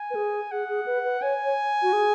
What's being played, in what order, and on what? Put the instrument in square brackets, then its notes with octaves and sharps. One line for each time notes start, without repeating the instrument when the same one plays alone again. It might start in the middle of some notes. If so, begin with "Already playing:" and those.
Already playing: [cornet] G#5
[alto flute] B4
G#4
[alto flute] G#4 [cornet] F#5
[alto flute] G#4
B4
B4
[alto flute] C#5 [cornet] G#5
[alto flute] C#5
F#4
G#4